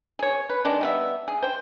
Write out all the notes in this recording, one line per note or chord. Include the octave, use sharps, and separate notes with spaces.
G#4 C#5
B4
D#3 G#3 D4
G3 B3 E5
G#4
C5 G5